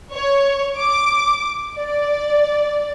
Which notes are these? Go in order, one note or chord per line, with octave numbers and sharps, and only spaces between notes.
C#5
D6
D5